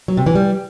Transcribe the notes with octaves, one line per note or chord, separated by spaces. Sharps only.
F#3
C3
E3
G3